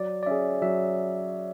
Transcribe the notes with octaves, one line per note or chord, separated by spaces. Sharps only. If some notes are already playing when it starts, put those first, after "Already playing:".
Already playing: F#3 D5
D5
C#4 G#4 E5
F#3 E5